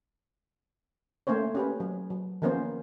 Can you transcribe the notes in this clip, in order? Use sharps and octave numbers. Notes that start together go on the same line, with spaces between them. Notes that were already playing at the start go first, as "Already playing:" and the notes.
A3 A#3 C#4 C5 C#5
C#4 G4 B4
F#3
F#3
D#3 F3 A#3 B3 C#4 C5